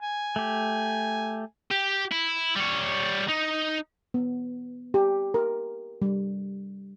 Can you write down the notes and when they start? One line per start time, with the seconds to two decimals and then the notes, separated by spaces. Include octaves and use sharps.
0.02 G#5
0.36 A3 G4
1.71 G4
2.11 E4
2.56 G3 C#5
3.28 D#4
4.14 B3
4.94 G4
5.34 A#4
6.02 G3